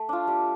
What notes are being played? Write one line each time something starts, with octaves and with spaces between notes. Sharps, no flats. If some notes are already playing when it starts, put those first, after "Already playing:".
Already playing: A3
D4 F4
G3